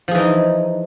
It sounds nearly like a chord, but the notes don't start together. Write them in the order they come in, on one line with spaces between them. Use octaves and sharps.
F3 G#4 E3 D#4